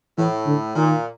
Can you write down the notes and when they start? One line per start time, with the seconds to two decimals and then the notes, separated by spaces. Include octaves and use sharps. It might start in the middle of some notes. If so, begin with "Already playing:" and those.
0.18 A2 E3
0.46 D3
0.76 A#2 D#3